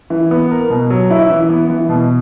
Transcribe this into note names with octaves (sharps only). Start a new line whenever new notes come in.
E3
B3
A#4
B2
F#3
E4
E3
B3
E3
B2